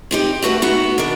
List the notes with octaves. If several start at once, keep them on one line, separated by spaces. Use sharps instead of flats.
C4 D#4 G4
A3 F#4 B4 F#5
B3 D#4 F#4
D#3 D4